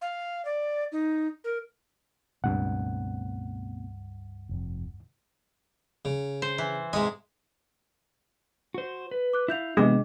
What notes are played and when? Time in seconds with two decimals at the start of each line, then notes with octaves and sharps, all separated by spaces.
0.01 F5
0.45 D5
0.92 D#4
1.44 A#4
2.44 C#2 G2 B2 A3 C4 F#5
4.49 F1 F2
6.05 C#3
6.42 C5
6.58 E3
6.93 G#2 C3 G#3 G#5
8.74 F#4 C5
9.11 B4
9.33 D6 F#6
9.48 E4 E5 F5 G6 F7
9.77 C3 E3 G#3 B3 D4 F#4 D#5 D6